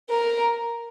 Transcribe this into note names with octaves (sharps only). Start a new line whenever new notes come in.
A#4